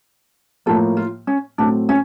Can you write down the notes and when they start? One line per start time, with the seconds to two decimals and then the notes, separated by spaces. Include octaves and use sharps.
0.66 A2 F3 A#3 A4
0.97 F4
1.27 C#4
1.58 A2 F#3 A3 C4 D4
1.89 C#4